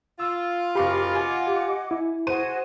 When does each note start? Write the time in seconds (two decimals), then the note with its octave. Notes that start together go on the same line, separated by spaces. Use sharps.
0.20 F4 E6
0.75 F#1 G4 F5 B5 C#6 D6
1.15 D#5 F#5 G#5 D6
1.47 G4
1.91 E4
2.27 F#4 G#4 C5 F#5 D#7